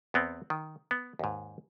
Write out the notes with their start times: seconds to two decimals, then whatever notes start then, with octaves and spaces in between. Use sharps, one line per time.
0.14 E2 B3 C4
0.50 D#3
0.91 B3
1.19 D#2 G#2